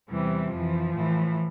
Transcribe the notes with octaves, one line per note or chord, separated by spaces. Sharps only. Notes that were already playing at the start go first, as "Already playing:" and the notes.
E2 C3 E3 G3
F2 E3 F3
A2 E3